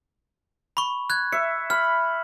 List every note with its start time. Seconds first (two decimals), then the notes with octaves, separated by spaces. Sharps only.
0.77 B5 C#6
1.10 F#6 G#6
1.33 E5 C#7
1.70 B5 F6